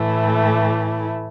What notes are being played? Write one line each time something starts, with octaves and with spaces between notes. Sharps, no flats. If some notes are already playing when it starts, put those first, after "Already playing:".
Already playing: A2 E3 A3 E4